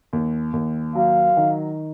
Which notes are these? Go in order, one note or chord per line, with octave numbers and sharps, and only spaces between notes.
D#2
D#2
F#3 F5
D#3